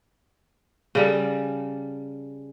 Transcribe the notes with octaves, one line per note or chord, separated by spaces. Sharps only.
C#3 G3 A4